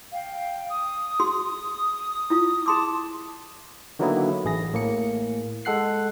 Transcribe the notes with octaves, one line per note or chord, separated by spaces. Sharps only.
F5 G5
D#6
F#4 G#4 C6
E4 F4
G#4 A5 C6 D6 D#6
D3 D#3 F#3 A#3 B3 E4
A1 G#4 A#6
A2 A#3 C#7
G#3 A4 F#5 F#6 C7